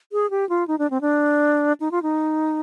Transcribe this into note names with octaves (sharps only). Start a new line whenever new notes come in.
G#4
G4
F4
D#4
D4
C4
D4
D#4
F4
D#4